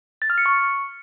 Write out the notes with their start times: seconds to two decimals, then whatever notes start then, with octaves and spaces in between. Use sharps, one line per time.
0.22 A6
0.30 F6
0.38 C#7
0.46 C#6